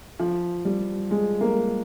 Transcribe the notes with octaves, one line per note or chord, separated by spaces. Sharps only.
F3
G3
G#3
A#3